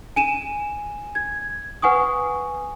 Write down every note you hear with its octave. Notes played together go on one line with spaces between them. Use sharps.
G#5 D#7 E7
G#6
B4 F#5 G#5 C#6 D#6